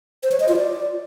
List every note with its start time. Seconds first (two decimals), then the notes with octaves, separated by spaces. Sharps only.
0.23 C5
0.32 C#5
0.40 D#5
0.49 F4
0.57 D5